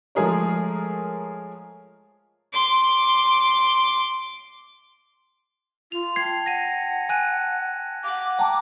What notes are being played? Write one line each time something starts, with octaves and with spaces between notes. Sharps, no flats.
F3 G#3 A3 G#4 A#4 C#5
C6 D6
F4 F7
G5 A5 G#6 C7
F#5 A#6 D#7
G#5 F#6 D#7
F5 F#5 D6
G5 A5 A#5